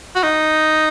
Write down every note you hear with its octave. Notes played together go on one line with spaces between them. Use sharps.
F#4
D#4